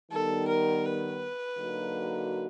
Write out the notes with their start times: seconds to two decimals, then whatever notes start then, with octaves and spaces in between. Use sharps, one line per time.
0.12 D#3 G3 B3 A4
0.48 A#4
0.85 B4
1.58 D3 F#3 A#3 D#4 F#4